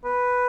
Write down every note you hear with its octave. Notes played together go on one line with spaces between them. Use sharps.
B4